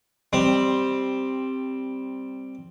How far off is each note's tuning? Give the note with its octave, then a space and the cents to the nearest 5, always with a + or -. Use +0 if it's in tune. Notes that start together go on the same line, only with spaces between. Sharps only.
G3 +0 C4 +5